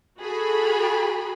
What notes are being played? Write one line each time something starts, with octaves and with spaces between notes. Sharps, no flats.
F#4 G#4 A4 B5